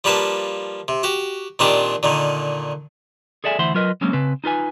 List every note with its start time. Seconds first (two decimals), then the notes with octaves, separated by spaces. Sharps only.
0.04 F3 G3 A#3 B4 A5
0.88 C3
1.03 F#4 G4
1.59 A#2 D#3 C4 D4 G4
2.03 A#2 D3 D#3
3.44 G#4 A4 D5 E5 G5 G#5
3.59 D2 E3 C5 E5 F#5 C6
3.74 F#3 F4 A#4 B4 D#5
4.01 F#3 G#3 A#3 C4 C#4
4.13 C#3 C4 B4
4.44 D#4 F4 B4 G#5